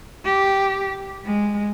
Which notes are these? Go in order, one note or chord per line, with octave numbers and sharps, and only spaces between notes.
G4
G#3